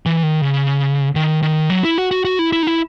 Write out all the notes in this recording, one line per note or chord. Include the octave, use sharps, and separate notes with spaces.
E3
D#3
C#3
D#3
D#3
F#3
E4
F#4
F#4
F#4
E4
E4
D#4
E4